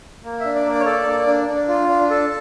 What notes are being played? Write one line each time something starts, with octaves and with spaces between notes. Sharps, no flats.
A#3
D4 E5
D5
A#3 D5
C#5
A4 D5
A#3
D4
D4
F4
D4
A4